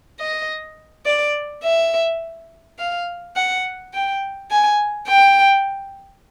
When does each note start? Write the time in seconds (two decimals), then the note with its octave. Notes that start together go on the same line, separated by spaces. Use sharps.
0.19 D#5
1.06 D5
1.63 E5
2.79 F5
3.36 F#5
3.94 G5
4.51 G#5
5.08 G5